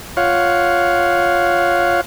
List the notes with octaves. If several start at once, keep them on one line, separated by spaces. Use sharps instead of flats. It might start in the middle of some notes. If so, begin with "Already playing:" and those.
F4 C#5 F5 F#5